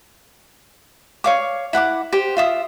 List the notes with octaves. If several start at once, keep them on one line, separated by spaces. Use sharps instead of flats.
C#5 F5 D6
E4 F#5 A5 D6
G4 C5
F4 E5 D#6